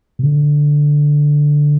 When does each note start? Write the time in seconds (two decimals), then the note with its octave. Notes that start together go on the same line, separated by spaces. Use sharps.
0.19 B2
0.23 D3